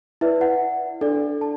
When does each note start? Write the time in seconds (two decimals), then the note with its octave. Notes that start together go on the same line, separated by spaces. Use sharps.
0.21 E4 B4 D5 E5
0.41 F#5
1.01 D4 A4 D5
1.41 A5